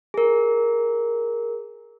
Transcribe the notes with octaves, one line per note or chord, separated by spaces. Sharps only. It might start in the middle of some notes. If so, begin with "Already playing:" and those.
G#4 A#4